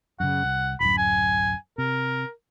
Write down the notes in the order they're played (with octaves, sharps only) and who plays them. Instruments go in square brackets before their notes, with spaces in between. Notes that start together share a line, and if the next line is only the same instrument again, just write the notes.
[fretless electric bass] F#2 C#3 [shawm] F#5
[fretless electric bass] C2
[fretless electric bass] D1 F#2 [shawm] B5
[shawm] G#5
[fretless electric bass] C3 [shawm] A#4